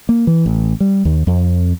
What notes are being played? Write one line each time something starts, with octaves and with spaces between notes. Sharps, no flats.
A#3
E3
A1
G3
D#2
F2